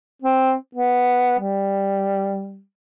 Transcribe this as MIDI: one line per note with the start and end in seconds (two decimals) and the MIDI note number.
0.22 0.54 60
0.75 1.35 59
1.39 2.61 55